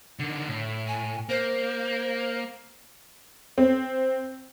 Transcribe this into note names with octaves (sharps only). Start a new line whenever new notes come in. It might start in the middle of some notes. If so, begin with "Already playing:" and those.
D3 D#3
A2
G#5
A#3 C5
C4